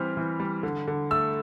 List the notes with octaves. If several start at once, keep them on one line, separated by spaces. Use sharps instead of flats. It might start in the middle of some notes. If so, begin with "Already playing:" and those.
Already playing: E3 G3 C4 F6
E3
G3
D3
D3
A3 E6